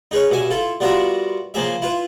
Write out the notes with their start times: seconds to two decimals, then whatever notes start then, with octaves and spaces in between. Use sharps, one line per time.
0.11 D#4 G#4 B4 C#5
0.31 G2 B2 E5 G#5
0.50 E4 F4 A4
0.80 G3 B3 F4 F#4 A#4 E5
1.54 C#3 F3 A#3 G#4 E5
1.82 E4 F4 B4